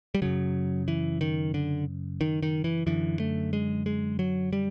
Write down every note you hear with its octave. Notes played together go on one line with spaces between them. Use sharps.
G3
F#2 C#3 F#3
E3
D#3
D3
D#3
D#3
E3
F#2 D3 E3
A3
G#3
G#3
F#3
G3